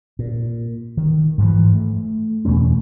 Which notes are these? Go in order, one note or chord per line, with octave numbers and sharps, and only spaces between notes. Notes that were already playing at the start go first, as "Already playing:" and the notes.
A#2
D#3
G#2 E3 F3
A3
E2 B2 A3 C#4